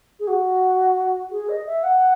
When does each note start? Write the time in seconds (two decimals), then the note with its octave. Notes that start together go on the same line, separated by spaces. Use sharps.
0.19 G#4
0.27 F#4
1.31 G#4
1.49 D#5
1.66 E5
1.83 F#5